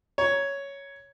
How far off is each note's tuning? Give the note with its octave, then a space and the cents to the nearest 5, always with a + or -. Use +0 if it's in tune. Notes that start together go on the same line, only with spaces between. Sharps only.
C#5 +5 A#5 +15